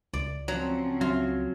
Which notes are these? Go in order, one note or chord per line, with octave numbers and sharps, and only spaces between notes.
C#2 D5
F3 F#3 C4 C#4
F#3 F4